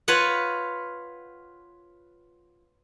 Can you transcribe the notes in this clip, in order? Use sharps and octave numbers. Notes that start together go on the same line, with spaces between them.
F4 B4 C#5 F#5